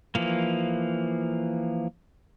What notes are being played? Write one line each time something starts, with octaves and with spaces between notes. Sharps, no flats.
E3 F3 A#3